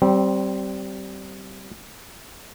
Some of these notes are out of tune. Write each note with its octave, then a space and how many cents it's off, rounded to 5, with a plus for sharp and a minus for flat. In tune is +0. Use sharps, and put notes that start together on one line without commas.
G3 -20 C4 +0